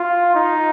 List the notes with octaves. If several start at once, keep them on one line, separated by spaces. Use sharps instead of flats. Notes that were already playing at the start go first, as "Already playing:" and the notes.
Already playing: F4
D#4